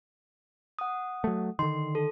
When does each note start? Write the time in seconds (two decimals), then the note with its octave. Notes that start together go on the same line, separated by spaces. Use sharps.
0.79 F#5 D#6
1.24 F#3 A3
1.59 D3 D#3 C6
1.95 A4